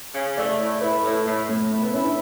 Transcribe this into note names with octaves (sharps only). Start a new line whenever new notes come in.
C#3
A3 D5
A2
E4 B4
A2 A4
A2
A2 A3
A3 E4
B3
C#4 E4
D4